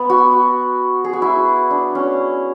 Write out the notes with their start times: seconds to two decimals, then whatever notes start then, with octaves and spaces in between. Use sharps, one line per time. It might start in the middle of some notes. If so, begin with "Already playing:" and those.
Already playing: B3
0.10 F#4
1.04 G#4
1.13 F#4
1.22 E4
1.71 D4
1.95 C#4